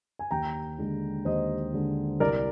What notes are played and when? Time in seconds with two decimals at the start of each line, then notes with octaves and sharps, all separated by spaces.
0.19 G#5
0.31 D#2 G5 A#5
0.78 D3 G#3
1.25 D#2 C5 D#5
1.74 D3 G#3
2.20 C2 A#4 D5